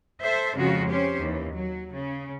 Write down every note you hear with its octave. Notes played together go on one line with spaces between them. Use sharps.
A4 C5 E5
F2 C#3 G#3 F4 F#4
C#4 G4 C5
D#2 E3
F#3
C#3